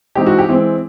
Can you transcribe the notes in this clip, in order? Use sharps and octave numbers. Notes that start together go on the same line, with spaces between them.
E3 G#3 C4 D#4 G4
F#4
G4
E3 G#3 C4